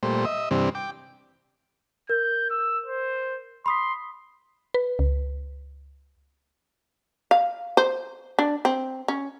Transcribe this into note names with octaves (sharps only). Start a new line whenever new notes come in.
A#2 G3 A3 C5
D#5 E5
G2 C3 E3 G3 C4 D4
G5 D6
A#4 G6
E6
C5
B5 C6 D#6 B6
B4
C#2
F5
C5
D4
C4
C#4